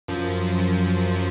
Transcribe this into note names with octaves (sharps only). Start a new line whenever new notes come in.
F#2 F3